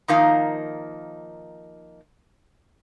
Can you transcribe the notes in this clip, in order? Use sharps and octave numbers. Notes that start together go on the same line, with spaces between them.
D#3 F3 A#3 D#4 F5